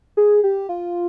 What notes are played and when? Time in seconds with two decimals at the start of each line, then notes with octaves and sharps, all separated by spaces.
0.17 G#4
0.44 G4
0.69 F4